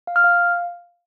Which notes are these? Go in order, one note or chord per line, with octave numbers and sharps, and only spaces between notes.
F5
F6
F5